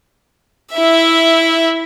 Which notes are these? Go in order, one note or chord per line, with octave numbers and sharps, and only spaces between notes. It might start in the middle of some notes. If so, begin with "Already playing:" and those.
E4 E5